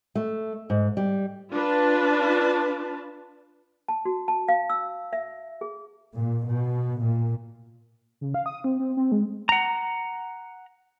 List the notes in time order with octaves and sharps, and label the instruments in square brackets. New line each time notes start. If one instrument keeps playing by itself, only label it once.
[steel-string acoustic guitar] A3
G#2
G3
[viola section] D4 F4 B4 A5
[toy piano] A5
F#4
A5
F5
E6
E5
G#4
[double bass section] A#2
B2
A#2
[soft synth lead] C#3
F5
D#6
C4
C4
C4
G#3
[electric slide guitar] F#5 A#5